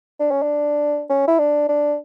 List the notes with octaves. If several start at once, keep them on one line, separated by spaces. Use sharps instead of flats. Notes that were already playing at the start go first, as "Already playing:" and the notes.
D4
C#4
D4
C#4
E4
D4
D4